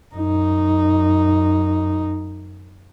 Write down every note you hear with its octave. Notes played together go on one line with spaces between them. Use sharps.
F#2 D#4